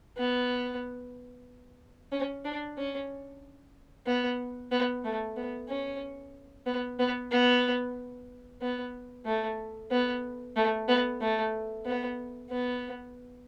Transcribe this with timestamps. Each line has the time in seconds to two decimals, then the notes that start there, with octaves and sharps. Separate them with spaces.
0.17 B3
2.12 C#4
2.45 D4
2.78 C#4
4.07 B3
4.72 B3
5.04 A3
5.37 B3
5.69 C#4
6.67 B3
6.99 B3
7.31 B3
8.61 B3
9.26 A3
9.91 B3
10.56 A3
10.88 B3
11.21 A3
11.86 B3
12.50 B3